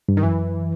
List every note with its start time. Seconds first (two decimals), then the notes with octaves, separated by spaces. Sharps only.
0.09 G2
0.17 D#3
0.23 F#2 E3